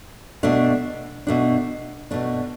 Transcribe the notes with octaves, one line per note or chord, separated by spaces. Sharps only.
B2 A3 D4
B2 A3 D4
B2 A3 D4